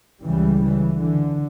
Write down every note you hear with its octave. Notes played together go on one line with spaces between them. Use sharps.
C#2 C#3 E3 G3
C#3 E3
D3